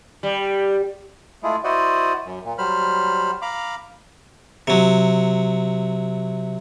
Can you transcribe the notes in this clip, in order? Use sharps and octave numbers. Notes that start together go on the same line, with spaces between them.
G3
G#3 A3 E4 F4 G#4
E4 F#4 C5 D5 D#5 F#5
F#2
A#2
F#3 G3 C5 B5 F6
F5 A#5 B5 D6
C3 F#3